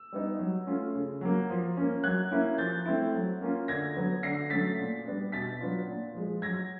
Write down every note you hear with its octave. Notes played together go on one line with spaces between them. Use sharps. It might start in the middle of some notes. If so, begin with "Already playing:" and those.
Already playing: E6
G3 B3 D#4
F#3
A3 C#4 F4
C#3
F#3 A#3
F3
A#3 C#4
F#3 F#6 G#6
A#3 C#4 E4
F3 G6 A6
A3 C4 E4
F#3
A#3 C#4 F4
D3 G#6 A#6
F#3 B3
D3 A#6 C7
F#3 A3 C#4 A6 B6
A#2
G3 B3 D4
B2 A6 B6
F#3 B3 D4 F4
A#2
F3 G#3
F#3 G#6 A#6